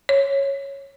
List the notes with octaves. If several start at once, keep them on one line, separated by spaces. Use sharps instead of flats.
C#5